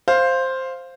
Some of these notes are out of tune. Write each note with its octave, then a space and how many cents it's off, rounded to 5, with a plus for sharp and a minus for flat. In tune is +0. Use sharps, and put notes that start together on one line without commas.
C5 +5 F5 +0